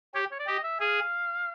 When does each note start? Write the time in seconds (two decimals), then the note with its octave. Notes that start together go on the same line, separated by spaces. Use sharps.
0.14 G4 C#5
0.31 C#5
0.39 D5
0.47 G4 D#5
0.64 E5
0.80 G#4 F5